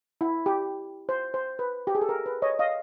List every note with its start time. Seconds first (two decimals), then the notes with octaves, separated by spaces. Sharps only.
0.21 E4
0.46 G4
1.09 C5
1.34 C5
1.59 B4
1.87 G4
1.95 G#4
2.02 A4
2.09 A#4
2.26 B4
2.42 C#5 D#5
2.59 D#5 F5